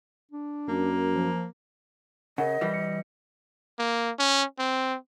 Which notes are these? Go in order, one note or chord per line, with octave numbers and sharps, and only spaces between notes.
D4
F#2 A#3
F3
C#3 A#4 D#5 F#5
E3 G3
C#7
A#3
C#4
C4